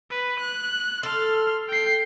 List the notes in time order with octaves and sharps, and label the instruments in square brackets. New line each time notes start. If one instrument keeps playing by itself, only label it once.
[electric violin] B4
F#6
[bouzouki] A4 [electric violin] C6 F6
[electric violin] G5 C7